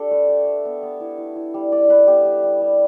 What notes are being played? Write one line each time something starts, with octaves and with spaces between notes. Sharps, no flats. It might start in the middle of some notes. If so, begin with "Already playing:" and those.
Already playing: D4 G4 A4
A3 B4
A3
A3
B3
B3
E4
E4
E4
G3
G3 D5
E4 B4
B3 G4
G3
G3
G3